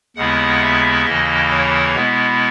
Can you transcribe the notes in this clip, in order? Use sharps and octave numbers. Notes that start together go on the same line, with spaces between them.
D#2 C#3 G#3 B3 E4 F#5
E5
D#2 C#3 E3 A#3 E4 D#5
C#5
B2 G#3 B3 E4